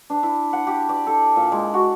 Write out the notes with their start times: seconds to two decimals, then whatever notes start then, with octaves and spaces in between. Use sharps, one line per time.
0.10 D4
0.23 E4
0.53 F#5
0.67 G4
0.89 D5
1.07 A4
1.36 A#2
1.52 G#3
1.74 F#4